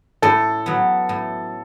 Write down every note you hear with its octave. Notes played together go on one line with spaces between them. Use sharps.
A2 A4
F#3 B3
A2